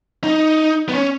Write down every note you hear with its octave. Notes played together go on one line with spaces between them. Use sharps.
D#4
B3
C#4